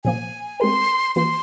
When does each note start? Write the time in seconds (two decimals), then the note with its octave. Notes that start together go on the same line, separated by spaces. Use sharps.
0.05 A#2 F3 A#3 G#5
0.60 G#3 C4 G4 A#4 C6
1.16 E3 A#3 F4 C6